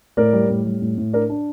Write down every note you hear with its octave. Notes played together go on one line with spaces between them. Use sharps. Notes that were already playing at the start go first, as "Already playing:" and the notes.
A2 A#4 D5
G3
A2
G3
A2
A2
D4 A#4 D5
D4